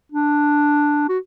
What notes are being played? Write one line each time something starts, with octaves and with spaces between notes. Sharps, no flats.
D4
F#4